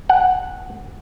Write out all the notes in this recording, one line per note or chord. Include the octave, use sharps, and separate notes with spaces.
F#5